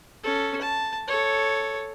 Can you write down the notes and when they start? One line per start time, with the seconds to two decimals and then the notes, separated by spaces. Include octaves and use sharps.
0.24 C#4 A4
0.62 A5
1.08 A4 C#5